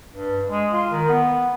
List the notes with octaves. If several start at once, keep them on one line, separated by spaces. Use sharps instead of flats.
G2
G#3
F4
D#3
B3